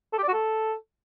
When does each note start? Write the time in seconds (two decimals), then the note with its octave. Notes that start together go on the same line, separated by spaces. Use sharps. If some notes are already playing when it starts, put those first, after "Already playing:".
0.13 A4
0.18 G4
0.23 D5
0.28 F#4
0.33 A4